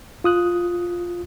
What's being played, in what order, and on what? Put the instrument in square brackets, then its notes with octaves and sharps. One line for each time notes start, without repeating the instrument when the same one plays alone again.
[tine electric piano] F4 D#6 F#6